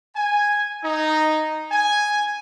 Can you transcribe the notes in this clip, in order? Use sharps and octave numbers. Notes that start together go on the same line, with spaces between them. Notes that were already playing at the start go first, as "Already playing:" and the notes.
G#5
D#4
G#5